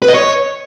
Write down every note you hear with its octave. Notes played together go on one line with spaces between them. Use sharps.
B4
D#5
C#5